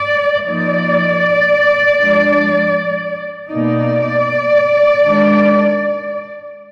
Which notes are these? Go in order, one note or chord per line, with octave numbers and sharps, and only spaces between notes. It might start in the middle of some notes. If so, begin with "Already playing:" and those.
Already playing: D5
F3 A#3 D#4 D5
F3 G#3 D4
B2 A#3 D#4 D5
D#3 G#3 D4